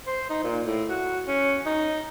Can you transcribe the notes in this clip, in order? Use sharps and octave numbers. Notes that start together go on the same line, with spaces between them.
C5
D#4
A#2
A2
F#4
C#4
D#4